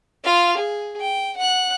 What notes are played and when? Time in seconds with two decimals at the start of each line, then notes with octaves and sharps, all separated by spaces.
0.24 F4 F5
0.57 G#4
1.00 G5
1.37 F#5 F#6